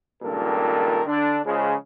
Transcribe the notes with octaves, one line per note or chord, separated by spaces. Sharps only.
C#2 G2 A#2 D#3 A4 A#4
D3 D4
C#3 F3 G#3